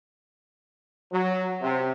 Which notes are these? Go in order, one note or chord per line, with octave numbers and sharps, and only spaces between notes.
F#3
C3